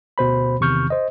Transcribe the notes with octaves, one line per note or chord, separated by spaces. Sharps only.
D2 B2 C5 B5
E2 C3 D#3 C#6 F6 G6
C5 D#5